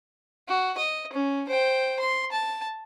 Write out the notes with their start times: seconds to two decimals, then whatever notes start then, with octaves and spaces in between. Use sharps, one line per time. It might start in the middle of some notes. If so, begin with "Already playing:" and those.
0.48 F#4
0.77 D#5
1.13 C#4
1.48 C5 G5
2.00 C6
2.32 A5